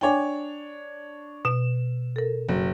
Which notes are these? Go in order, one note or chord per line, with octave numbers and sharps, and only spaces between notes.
D4 C#5 G5 G#5 D6
B2 E7
A4 A#4
F#1